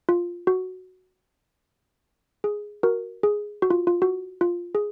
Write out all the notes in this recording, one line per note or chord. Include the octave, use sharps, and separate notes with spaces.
F4
F#4
G#4
F#4 A#4
G#4
F#4
F4
F4
F#4
F4
G#4